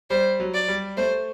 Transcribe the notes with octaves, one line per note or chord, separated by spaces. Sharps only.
G3 C5
F#3
D5
G3
A3 C5